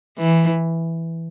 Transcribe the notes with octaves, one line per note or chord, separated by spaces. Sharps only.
E3